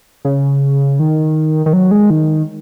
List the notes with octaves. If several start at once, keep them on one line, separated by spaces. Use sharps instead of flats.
C#3
D#3
D#3
F#3
G#3
D#3